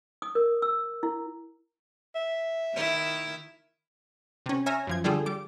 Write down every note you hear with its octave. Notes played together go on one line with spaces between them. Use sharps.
D#6
A#4
E6
E4
E5
D#3 E4
C3 C#4
C#5 E5 G#5 A#5 F6 A#6
F#2 F3 G#6
D3 G3 D4 F4 G#4 A4
G3 D6